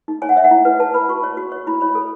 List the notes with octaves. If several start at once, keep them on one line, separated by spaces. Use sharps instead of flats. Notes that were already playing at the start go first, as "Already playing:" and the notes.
D#4
C#5 G#5
F#5
C#5 E5
F#5
E4
B4
B4 A5
B4 B5
F#4 C#6
C#5
F#4
C#5
E4 B5
C#5 B5
A4